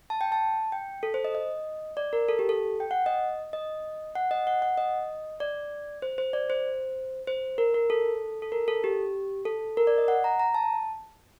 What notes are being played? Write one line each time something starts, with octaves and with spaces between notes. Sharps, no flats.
A5
G5
A5
G5
A4
C5
D#5
D#5
D5
A#4
A4
G4
A4
G5
F#5
D#5
D#5
F#5
D#5
F#5
F#5
D#5
D5
C5
C5
D5
C5
C5
A#4
A#4
A4
A4
A#4
A4
G4
A4
A#4
D5
D#5
F#5
A#5
A#5
A5